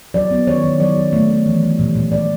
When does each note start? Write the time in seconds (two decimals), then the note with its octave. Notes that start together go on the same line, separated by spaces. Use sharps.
0.14 F#3 D5
0.31 B3
0.47 D#3 C#5
0.64 D#3
0.80 F#3 D5
0.97 F#3
1.13 A3
1.30 A3
1.46 E3
1.62 G3
1.79 A#2
1.95 A#2
2.11 A#2 D5